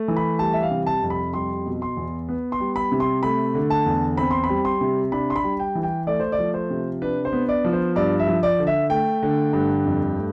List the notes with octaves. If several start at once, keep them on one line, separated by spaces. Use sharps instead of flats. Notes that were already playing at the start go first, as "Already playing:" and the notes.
Already playing: A3
E3
B5
G3 A5
E5
F5
C3
A5
F2
B5
G3 C6
B2
C6
E2
B3
C6
G3
B5
C3
C6
A3 B5
D3
A5
E2
C4 B5
C6
B5
G3
C6
C3
D4 B5
C6
B5
G3
G5
E3
G5
A3 D5
C5
D5
F3
C5
C3
D4 B4
C5
B3
D5
F3
C5
G2 D5
E5
F3
D5
D3
E5
A3 G5
D3
G2
F2
A3